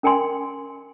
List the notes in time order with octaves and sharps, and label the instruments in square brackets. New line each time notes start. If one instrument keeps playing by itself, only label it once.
[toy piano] C#4 A#4 G5 G#5 C6